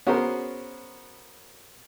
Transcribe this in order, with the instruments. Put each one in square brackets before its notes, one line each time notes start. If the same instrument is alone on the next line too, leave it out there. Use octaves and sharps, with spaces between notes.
[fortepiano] B3 C#4 F#4 G#4 A#4 C5